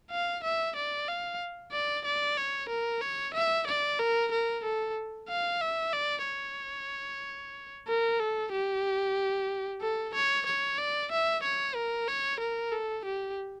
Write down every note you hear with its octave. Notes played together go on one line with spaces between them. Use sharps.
F5
E5
D5
F5
D5
D5
C#5
A#4
C#5
E5
D5
A#4
A#4
A4
F5
E5
D5
C#5
A#4
A4
G4
A4
C#5
C#5
D5
E5
C#5
A#4
C#5
A#4
A4
G4